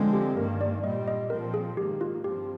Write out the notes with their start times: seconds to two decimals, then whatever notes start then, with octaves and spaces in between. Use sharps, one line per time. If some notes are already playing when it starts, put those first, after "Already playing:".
Already playing: D3 F3 G#3 C4
0.13 G4
0.37 G2 D#3 A#3 A#4
0.61 D5
0.84 A#2 G3 C4 D#5
1.08 D#5
1.30 A#2 F3 C4 A#4
1.54 G#4
1.77 G#2 D#3 A#3 G4
2.01 F4
2.24 G2 F3 C4 G4